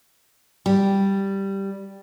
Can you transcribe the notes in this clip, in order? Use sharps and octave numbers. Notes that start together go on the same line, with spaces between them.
G3